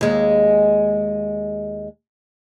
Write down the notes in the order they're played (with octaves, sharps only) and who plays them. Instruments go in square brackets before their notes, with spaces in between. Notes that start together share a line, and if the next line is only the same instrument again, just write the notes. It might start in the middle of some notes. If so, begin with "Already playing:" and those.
[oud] D#2 G#3